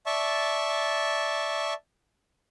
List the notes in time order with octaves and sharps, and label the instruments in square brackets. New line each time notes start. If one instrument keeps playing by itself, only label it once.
[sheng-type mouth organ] D5 E5 A5 C#6